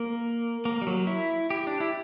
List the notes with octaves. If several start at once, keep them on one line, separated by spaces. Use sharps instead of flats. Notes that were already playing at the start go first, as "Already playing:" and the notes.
Already playing: A#3
A#3
G3
F#3
E4
G4
D4
E4